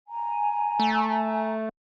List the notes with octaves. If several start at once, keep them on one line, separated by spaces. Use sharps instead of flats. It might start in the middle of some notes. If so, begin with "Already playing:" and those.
G#5 A#5
A3